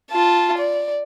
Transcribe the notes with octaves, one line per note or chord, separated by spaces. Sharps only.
F4 A5
D5